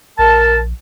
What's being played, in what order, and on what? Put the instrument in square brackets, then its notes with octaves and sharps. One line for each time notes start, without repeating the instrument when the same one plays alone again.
[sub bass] A#1 [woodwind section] A#4 A5